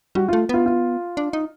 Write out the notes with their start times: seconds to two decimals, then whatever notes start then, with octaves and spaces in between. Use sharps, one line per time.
0.15 G3 F#4
0.28 F4
0.33 A3
0.49 B3 F4
0.66 F4
1.17 D4
1.33 D#4